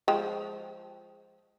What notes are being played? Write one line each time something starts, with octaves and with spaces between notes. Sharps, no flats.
F3 G#3 G5